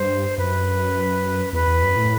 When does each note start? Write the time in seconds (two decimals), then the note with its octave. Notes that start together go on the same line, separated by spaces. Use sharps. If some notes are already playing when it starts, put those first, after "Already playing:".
Already playing: G2 C5
0.38 F#2 B4
1.53 E2 B4
1.67 E2
1.82 F#2
1.96 A2